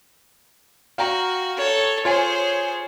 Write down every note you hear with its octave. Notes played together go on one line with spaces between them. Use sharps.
F#4 F5 G5 A#5
A4 C#5
F4 G#4 C5 C#5 G#5